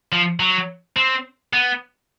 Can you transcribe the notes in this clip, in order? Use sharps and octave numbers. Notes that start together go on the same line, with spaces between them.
F3
F#3
C4
B3